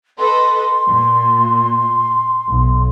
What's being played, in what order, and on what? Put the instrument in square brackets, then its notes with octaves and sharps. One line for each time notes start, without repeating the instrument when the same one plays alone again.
[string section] A4 B4 D#5 [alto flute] C6
[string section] A#2
B1